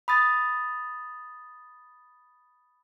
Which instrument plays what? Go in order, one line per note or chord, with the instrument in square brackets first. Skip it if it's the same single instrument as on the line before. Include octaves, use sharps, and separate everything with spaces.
[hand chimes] B5 D#6 A6